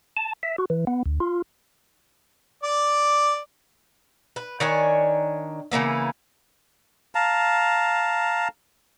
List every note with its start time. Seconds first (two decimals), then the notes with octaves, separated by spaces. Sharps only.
0.17 A5
0.43 E5
0.58 F#4
0.70 E3
0.87 B3
1.06 D2
1.20 F4
2.63 D5 D6
4.36 B4
4.60 D#3 D4 C#5 G#5
5.72 C#3 E3 A#3 B3
7.15 F5 A5 A#5